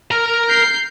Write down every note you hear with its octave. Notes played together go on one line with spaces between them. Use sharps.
A#4 A#5
G6 C7